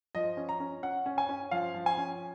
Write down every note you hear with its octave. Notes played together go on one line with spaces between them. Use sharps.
F3 D#5
C#4
A#5
C#4
C#4 F#5
C#4
G#5
C#4
F3 F5
F3
G#5
C#4